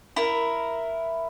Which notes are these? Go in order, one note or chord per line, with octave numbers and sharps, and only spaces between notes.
E4 A#4